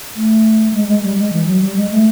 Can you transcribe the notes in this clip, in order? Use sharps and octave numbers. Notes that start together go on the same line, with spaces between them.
A3
G#3
G#3
G3
G#3
E3
F#3
G3
G#3
A3